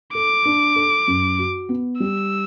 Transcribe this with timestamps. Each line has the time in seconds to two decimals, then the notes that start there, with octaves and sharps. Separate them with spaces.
0.15 A4 D6
0.45 D4
0.76 A4
1.08 F#2
1.39 F#4
1.69 B3
2.00 G3 E6